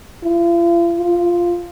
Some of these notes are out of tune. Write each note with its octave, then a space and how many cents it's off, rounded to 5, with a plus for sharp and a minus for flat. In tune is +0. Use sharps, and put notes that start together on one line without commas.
F4 -40
F4 -5